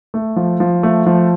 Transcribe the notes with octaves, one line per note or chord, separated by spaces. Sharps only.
A3
F3
F3
A3
F3